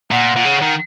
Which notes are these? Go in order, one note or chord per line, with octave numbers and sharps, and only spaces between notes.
A#2 F#5
A#2
C#3
D#3